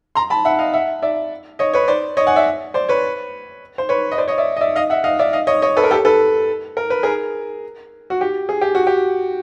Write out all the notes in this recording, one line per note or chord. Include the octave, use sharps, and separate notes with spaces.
A#5 C6
A5 B5
E5 F#5
D#5 F5
E5 F#5
D5 E5
C#5 D#5
B4 C#5
C5 D5
C#5 D#5
F#5 G#5
D5 E5
C5 D5
B4 C#5
C5
B4 C#5
D#5
C5 D5
C#5 D#5
D5 E5
D#5
D5 E5
D#5 F5
E5 F#5
D#5 F5
D5 E5
D#5 F5
C#5 D#5
C#5 D#5
A4 B4
A#4
G4 A4
A4 B4
A#4
B4
G#4 A#4
F#4
G4
G#4
G4
F#4
G4